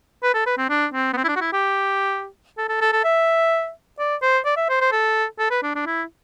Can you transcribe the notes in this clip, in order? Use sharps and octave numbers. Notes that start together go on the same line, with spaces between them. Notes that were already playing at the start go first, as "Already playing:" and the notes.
B4
A4
B4
C4
D4
C4
B3
C4
E4
D4
F#4
E4
G4
A4
A4
A4
A4
E5
D5
C5
D5
E5
C5
C5
A4
A4
B4
D4
D4
E4